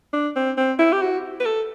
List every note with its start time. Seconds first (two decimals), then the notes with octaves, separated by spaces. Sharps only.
0.13 D4
0.36 C4
0.57 C4
0.79 E4
0.92 G4
1.02 F#4
1.40 B4
1.45 A4